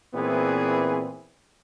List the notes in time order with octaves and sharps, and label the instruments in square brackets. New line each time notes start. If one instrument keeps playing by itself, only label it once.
[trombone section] A#2 E3 B3 C4 E4 G#4